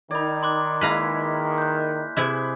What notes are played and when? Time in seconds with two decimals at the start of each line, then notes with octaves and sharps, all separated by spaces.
0.11 D#3 D#4 D5 B5 G#6
0.43 C6 D6 F#6
0.81 G#3 A#3 E4 B4 F5 A#5 B6
1.58 F#6 G6
2.17 C3 E4 G#4 B4 E5 D6